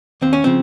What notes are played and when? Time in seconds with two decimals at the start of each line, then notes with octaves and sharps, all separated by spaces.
0.22 D#2 C4
0.33 C#4
0.44 C#3 F3 C4